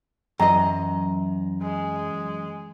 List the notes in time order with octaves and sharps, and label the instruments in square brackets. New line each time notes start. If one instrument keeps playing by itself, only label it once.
[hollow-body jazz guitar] F#2 D#5 [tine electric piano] E3 F#3 C#4 [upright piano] A#5
[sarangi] G#3